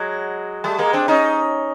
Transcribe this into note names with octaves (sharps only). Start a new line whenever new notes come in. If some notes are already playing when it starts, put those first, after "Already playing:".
Already playing: F#3 G#3
G3 A3
G#3 A#3
C4 D4
C#4 D#4